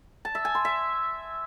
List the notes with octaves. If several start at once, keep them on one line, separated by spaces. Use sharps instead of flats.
A5
E5
G#5
C6
E5